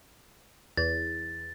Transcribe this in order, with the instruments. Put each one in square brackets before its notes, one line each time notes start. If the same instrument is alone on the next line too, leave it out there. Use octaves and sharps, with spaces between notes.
[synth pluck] E2 [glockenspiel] A6